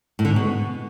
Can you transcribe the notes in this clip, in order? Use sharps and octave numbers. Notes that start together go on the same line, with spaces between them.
A2
D3
G#2
B2